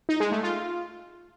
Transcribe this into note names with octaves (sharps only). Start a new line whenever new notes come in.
D#4
G#3
A3
F4